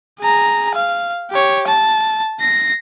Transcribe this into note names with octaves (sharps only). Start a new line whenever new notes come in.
G#4 A#5
F5
G4 C#5
A5
A#6 C7